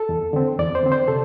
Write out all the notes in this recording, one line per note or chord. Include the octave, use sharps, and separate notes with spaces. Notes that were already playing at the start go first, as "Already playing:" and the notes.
Already playing: A4
E2
D3 C4
E2 D5
C5
D3 C4
C5
C3 A4